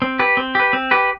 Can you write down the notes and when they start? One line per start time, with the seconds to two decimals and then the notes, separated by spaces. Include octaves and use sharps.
0.02 C4
0.19 G4 B4
0.37 C4
0.55 G4 B4
0.73 C4
0.91 G4 B4